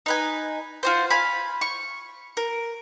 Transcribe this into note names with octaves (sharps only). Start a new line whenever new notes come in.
D#4 B4 G#5
F4 F#4 C5
F5 G#5 B5
C#6
A#4